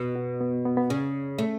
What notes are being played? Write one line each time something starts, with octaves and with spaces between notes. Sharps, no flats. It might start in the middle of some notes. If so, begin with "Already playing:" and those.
Already playing: B2
F#4
B3
B3
B3
C#3 C#4
A3